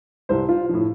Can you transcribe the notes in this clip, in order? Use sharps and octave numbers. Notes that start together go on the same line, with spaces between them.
C2 C3 G3 C5
F4
A2 F3